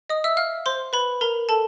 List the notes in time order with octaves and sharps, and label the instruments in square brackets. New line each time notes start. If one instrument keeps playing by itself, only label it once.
[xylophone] D#5 D#6
E5 E6
F5 F6
C5 C6
B4 B5
A#4 A#5
A4 A5